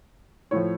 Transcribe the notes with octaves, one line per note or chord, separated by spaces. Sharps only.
A2 F3 C#5